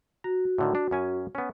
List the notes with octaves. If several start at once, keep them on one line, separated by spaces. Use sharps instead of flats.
F#4 A#5
A2 D3 D#3
D4
F#2 C#4 G#5
B3 C#4